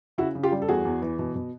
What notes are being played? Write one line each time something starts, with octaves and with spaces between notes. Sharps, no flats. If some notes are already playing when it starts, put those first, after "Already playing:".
C#3 E4 F#4
C#3
F4 G4
G3
A4
E2 F#4 G#4
E2
E3
B2
B2